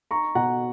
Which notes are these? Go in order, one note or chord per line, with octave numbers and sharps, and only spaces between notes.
D#4 A#5 C#6
B2 F#5 A#5